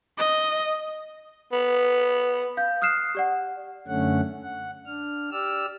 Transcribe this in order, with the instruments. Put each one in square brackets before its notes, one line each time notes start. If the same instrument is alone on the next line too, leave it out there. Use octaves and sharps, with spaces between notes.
[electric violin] D#5
[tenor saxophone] B3
[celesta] F5 G6
D#6 F6 F#6 C7 E7
G4 D5 F#5
[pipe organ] F#2 D3 A3 C#4 F#5
F#5
D4 F6
G4 D5 E6 F6